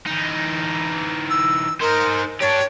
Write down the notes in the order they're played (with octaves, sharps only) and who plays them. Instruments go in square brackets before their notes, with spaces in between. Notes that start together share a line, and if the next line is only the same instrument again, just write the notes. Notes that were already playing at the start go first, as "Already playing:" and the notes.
[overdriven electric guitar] E3 D#4
[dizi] E6
[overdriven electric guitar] D#4 C5 [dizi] A#4
[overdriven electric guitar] D4 G4 [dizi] C#5